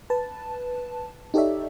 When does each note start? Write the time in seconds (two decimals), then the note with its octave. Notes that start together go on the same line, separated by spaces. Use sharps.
0.10 B4 A5
1.34 D#4 G4 A4 C#5 D5 E5